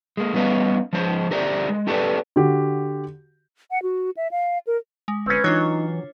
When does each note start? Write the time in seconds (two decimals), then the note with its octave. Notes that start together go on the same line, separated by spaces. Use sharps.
0.17 G#3 A#3
0.34 G3 B3 C#4 B4 D#5 F5
0.93 F3 G#3 C#4 C5
1.31 D3 G4 A#4 C5 D5
1.69 G#3
1.87 C#4 G4 A4 B4 C#5 D5
2.36 D3 F#4 G4
3.71 F#5
3.83 F#4
4.17 E5
4.31 F5
4.67 A#4
5.08 G#3
5.26 G1 C4 C#4 B4
5.44 E3 F#3 D4 D#4 F4 C#5